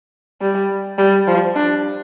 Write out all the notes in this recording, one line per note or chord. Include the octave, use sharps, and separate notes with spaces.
G3
G3
F3
D4